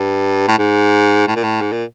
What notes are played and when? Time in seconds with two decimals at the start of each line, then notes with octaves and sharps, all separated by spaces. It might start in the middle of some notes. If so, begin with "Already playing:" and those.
Already playing: G2
0.48 A2
0.58 G#2
1.27 A2
1.35 A#2
1.43 A2
1.61 G#2
1.72 A#2